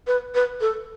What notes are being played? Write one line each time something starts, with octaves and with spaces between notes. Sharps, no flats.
B4
B4
A4